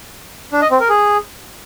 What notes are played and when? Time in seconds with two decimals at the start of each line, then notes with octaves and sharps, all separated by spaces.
0.53 D4
0.62 D#5
0.71 C4
0.80 A#4
0.89 G#4